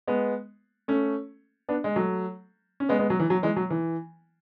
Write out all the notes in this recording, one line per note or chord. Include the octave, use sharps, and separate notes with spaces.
G#3 B3
A3 C#4
B3 D4
G#3
F#3 A3
C#4
G#3 B3
G#3 B3
F#3
E3
F#3
E3 G#3
F#3
E3